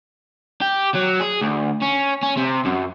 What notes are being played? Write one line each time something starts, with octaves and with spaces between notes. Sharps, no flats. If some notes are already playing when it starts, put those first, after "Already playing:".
G4
F#3
G#4
D2
C#4
C#4
C3
F#2